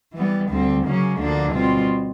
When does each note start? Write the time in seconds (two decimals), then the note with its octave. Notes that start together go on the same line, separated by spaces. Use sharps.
0.13 E3 G3 B3
0.49 D2 D3 G3 C4
0.83 C#3 F#3 A#3 C#4
1.18 D2 D3 F3 A#3 D4
1.52 B2 G3 C4 F4